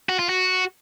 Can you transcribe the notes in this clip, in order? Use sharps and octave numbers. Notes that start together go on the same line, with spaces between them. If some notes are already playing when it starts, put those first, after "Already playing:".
F#4
F4
F#4